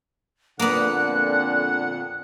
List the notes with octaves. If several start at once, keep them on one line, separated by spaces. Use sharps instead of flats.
F2 A#2 D3 A#3 B3 F#5 F#6